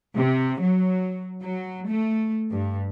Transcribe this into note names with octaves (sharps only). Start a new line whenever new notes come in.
C3
F#3
F#3
A3
G2